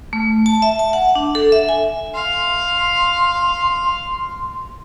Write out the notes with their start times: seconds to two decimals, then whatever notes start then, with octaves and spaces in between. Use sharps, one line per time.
0.13 A3
0.46 A5
0.62 E5
0.79 A5
0.93 F#5
1.15 D4
1.35 A4
1.52 E5
1.69 G#5
2.14 F5 C6